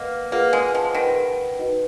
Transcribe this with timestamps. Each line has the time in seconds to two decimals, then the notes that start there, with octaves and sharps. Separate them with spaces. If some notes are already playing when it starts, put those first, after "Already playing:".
Already playing: A#3 B4 D#5 F#5
0.32 A#3 F4 G#4 B4 F#5
0.53 G#3
0.75 F3
0.95 D#3 B4 F#5 B5
1.59 D#4 F#4 B4 D#5